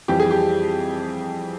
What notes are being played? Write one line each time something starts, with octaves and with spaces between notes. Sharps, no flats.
F2 E3 G3 G4
G#4
G4